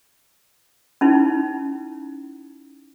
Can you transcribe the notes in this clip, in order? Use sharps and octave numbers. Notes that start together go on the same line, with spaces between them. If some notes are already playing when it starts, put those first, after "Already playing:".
C#4 D#4 E4